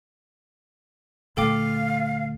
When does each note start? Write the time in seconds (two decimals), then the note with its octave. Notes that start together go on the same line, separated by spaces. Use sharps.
1.37 D2 A#2 A3 A4 F5 G5 D6